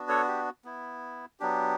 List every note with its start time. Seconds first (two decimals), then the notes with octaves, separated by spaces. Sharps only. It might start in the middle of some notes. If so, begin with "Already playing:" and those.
Already playing: B3 D4 F#4
0.08 A4 C#5
0.28 G4
0.65 B3 E4
1.40 F#3 B3 D4 G4